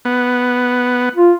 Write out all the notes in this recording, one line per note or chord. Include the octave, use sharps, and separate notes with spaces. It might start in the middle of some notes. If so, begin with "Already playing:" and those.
B3
F4